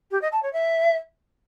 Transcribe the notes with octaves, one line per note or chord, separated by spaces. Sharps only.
G4
D#5
A5
C#5
E5